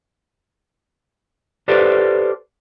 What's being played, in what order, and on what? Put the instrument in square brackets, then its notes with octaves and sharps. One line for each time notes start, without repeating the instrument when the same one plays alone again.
[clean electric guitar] G4 A4 B4 C5 D5